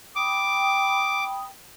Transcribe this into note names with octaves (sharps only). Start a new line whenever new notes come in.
G5 B5 D6 D#6